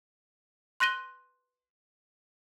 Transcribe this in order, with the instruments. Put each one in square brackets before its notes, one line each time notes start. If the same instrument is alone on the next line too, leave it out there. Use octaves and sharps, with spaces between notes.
[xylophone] C6 F#6 A#6 D#7 G7